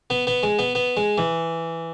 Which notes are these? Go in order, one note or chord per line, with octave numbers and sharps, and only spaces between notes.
B3
B3
G#3
B3
B3
G#3
E3